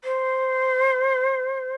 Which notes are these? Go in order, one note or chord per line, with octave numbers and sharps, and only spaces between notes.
C5